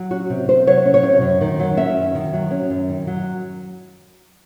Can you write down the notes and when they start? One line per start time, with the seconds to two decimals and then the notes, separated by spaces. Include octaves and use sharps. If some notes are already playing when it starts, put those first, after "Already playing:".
Already playing: F#3
0.10 C#4 F#4
0.30 C3
0.48 C3 C5
0.67 F#3 C#5
0.85 C#4
0.94 C#5
1.03 C3
1.22 F#2
1.41 D#3
1.60 F#3
1.77 C#4 E5
1.97 F#2
2.15 D#3
2.33 F#3
2.51 C#4
2.70 F#2
2.89 D#3
3.07 F#3